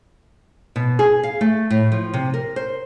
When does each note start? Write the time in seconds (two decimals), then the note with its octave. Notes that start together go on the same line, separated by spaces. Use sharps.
0.76 B2
0.99 G#4
1.23 F5
1.41 A3
1.70 A2
1.92 F3
2.14 C3
2.34 A#4
2.56 C5